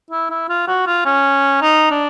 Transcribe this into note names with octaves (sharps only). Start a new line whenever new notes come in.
E4
E4
F4
F#4
F4
C#4
D#4
D4